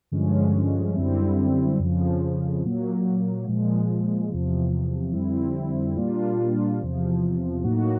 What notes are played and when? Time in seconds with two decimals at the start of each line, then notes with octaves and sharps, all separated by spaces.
0.12 G2 D3 F3 G#3 C#4
0.95 F#2 D3 G3 C4 E4
1.80 F2 C#3 F3
2.63 A#2 F#3 A#3
3.46 A#2 F3 G#3
4.29 E2 C3 F3
5.13 F2 D3 G3 C4 E4
5.96 A#2 G3 A#3 D4 F4
6.81 E2 C3 F3
7.63 A2 F#3 A#3 D#4 F#4